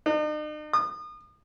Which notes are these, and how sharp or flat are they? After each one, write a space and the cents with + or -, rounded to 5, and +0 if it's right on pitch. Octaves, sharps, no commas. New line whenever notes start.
D#4 -45
D#6 -35